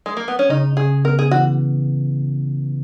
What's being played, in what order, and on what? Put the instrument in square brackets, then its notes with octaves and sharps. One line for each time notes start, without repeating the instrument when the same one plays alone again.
[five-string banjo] G#3
A#3
B3
C#4
[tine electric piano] C#3 [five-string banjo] D#4
[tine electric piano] C#3 [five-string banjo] G#4
[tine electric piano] B3 [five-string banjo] A#4
[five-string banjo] G#4
[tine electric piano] E3 [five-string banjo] F#4